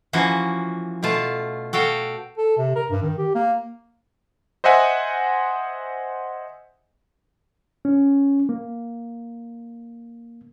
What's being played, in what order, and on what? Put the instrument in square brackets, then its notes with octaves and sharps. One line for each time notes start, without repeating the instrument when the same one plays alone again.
[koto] E3 F3 A#3 C#4 F#4
B2 A3 F4 A5
F#4 A4 F5 G5
[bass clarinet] A4
C3
A#4
G2
D#3
G4
A#3
[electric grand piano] C5 D#5 E5 F#5 G#5
[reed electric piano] C#4
A#3